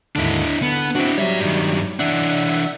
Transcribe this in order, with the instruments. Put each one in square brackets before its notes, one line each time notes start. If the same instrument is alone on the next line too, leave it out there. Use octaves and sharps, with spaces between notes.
[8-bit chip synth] D#2 G#2 D3 [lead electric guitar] D4 E4
[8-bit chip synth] D3 [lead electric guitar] B3
[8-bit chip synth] C4 F#4 [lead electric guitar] D4 E4
[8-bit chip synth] F#3 G3 [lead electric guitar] C#5 E5
[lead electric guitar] G2 D#3
[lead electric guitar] E3 D4 [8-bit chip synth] E5 F#5